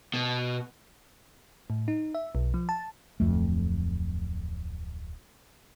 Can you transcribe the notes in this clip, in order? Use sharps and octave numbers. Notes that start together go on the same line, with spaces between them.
B2
A2
D#4
E5
B1
F3
A5
D1 F2 A3